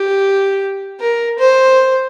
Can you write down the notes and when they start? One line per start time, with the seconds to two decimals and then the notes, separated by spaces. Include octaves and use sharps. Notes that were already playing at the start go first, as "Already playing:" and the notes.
Already playing: G4
1.00 A#4
1.39 C5